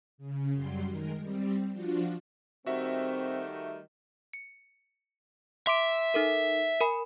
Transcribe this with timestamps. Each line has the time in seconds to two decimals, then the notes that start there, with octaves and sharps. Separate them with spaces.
0.18 C#3
0.53 F#2 F#3 G3 C6
0.89 D#3 G#3 A#4
1.20 G3 C4
1.72 F3 D4 F4 F#4
2.66 D#3 G3 A3 C4 F#4 E5
4.33 C#7
5.67 E5 C6 D6 D7
6.14 D#4 A4 A#4
6.81 A#4 G#5 B5